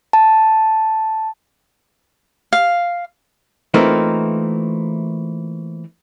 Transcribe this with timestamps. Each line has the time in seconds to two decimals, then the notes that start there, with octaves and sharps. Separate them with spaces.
0.13 A5
2.53 F5
3.74 E3 A3 A#3 C4 D#4 F4